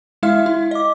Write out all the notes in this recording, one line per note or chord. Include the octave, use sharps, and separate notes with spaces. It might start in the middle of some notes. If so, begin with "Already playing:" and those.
G#3 E4 E5 F5 F6
E4
D#5 D6